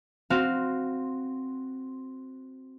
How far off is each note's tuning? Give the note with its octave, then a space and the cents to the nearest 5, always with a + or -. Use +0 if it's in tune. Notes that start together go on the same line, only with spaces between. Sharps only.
C4 +0 F#4 +0 F5 +0